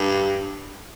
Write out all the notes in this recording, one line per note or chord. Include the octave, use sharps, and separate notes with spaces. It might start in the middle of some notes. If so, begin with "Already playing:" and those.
Already playing: G2